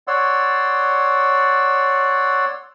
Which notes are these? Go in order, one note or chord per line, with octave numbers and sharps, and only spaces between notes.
C#5 D5 F#5 C6 E6